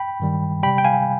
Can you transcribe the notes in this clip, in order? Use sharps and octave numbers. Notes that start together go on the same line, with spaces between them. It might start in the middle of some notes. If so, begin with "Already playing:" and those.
Already playing: G5 B5
G2 D#3 G3
C3 G3 G5 B5
G5
F5 G#5